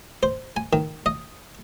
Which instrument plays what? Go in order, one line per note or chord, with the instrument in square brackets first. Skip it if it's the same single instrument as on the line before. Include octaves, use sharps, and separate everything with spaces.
[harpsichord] C5
G#5
D#3
D#5